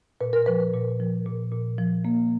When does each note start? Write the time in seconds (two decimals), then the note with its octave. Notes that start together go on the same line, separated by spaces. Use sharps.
0.21 A#2 B4
0.33 A#4
0.46 F3 B4
0.60 B4
0.74 A#2
1.00 F3
1.26 A#2
1.52 A#2
1.78 F3
2.05 A#3